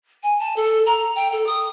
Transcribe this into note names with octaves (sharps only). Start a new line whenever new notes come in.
G#5
A5
A4
A#5
G5
A4
D#6